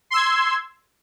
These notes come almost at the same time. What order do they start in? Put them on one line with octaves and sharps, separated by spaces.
C6 E6 G#6